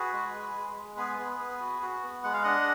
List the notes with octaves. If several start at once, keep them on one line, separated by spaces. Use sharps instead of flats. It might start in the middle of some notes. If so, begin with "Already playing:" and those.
Already playing: F#4 G#4 B4
G#3
G#3
G#3
G#3
B3 G#4 B4
B3
B3
F#4
F#4
B3
G#3 F#5
F5
D4 D#5 F#5